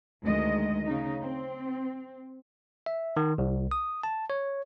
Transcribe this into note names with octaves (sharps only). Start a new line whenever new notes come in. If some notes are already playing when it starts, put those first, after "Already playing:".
D2 D#3 G#3 D#5
C#3 D#4
C4
E5
D#3
C2
D#6
A5
C#5